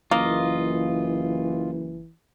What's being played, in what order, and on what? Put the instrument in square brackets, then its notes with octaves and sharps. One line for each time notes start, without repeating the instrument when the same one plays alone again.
[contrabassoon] F#1 [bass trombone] E3 [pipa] A#3 [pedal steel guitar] F4 D#5